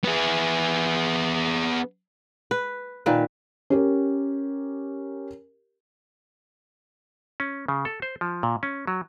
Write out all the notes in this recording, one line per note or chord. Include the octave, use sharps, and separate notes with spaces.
B3 G#4
B4
A#2 D#3 B4
C#4 G4 A#4
C#4
C#3
A4
C5
F3
A#2
C#4
F#3